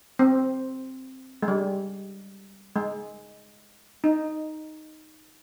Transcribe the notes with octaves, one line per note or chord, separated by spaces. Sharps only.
C4
G#3
G3
G#3
D#4